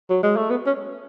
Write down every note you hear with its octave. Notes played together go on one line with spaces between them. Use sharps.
F#3
G#3
A3
B3
C#4